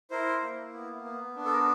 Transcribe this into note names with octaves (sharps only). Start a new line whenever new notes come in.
E4 A#4 C5
A#3
B3
B3
D4
A4
A#4